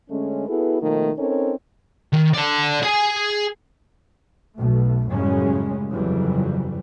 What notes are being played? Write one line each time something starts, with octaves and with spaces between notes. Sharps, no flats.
D3 G#3 A3 C#4
B3 E4 F#4 G#4 A4 B4
B2 D#3 F3 A3 A#3 D#4
C4 C#4 D#4 A4 A#4 C#5
D#3
A4 D5
G#4 G#5
B1 B2 A3
F#2 A2 C#3 G3 G#3 C#4
G1 F2 C#3 E3 F#3 G3